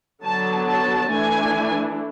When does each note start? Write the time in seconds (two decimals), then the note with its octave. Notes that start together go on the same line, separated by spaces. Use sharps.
0.23 D3 F#3 B3 A5
0.67 A5
1.11 E3 A3 D4 G#5